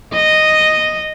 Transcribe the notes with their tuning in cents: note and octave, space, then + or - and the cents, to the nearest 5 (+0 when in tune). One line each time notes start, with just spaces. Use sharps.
D#5 -5